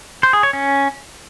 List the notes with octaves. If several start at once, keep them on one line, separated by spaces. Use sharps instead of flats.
C5
G#4
C#5
C#4